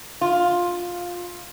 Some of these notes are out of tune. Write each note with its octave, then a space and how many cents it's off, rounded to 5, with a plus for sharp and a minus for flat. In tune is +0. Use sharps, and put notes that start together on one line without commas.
F4 +10